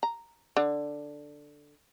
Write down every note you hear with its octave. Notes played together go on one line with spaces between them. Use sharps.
A#5
D3